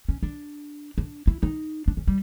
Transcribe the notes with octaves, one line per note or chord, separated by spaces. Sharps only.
C#4
D4
D4
E4
D#4
D4
C#4
G3